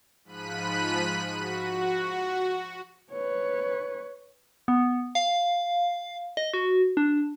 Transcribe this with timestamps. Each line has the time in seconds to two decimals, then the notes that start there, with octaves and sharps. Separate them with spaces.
0.24 G#2 F3 B5 F#6 B6 D#7
1.33 F#4
3.12 B4 C#5
4.68 B3
5.15 F5
6.37 D#5
6.53 F#4
6.97 D4